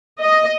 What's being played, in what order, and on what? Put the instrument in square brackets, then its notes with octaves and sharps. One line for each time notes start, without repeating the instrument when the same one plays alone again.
[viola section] D#5